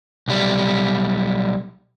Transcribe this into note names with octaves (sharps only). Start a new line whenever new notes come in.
B1 G3